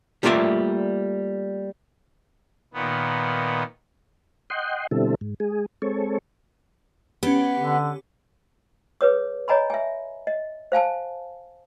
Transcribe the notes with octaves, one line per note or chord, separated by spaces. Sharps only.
G3 A3 A#3 F4 D5 E5
A#2 D#3 B3
D#5 F#5 G5 C6
B2 D3 G3 C4 E4 A4
G#2
G#3 G#4
G#3 C4 A4 C#5
B3 C#4 G4
D3
G#4 B4 C#5 D#6
C#5 D#5 G#5 A#5 B5
E5 G#5
D#5
C5 F5 G#5 A5